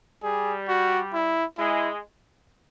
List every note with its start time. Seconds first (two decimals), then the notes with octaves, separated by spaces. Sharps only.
0.23 G3 G#4
0.68 F#4
1.13 E4
1.58 G#3 E4